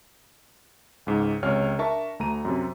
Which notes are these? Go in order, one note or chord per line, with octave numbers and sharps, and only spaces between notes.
C#2 G#2
C#2 C3 C#5 F6
D4 A#4 E5 A5 C#6
D2 A3 A#5 D#7
F#2 C3